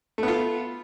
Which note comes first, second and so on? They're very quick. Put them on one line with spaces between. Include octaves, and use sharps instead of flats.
A3 B3 F4